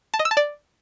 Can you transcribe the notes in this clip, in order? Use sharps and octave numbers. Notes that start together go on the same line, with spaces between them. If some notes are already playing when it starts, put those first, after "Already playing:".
A5
D#5
E6
A5
D5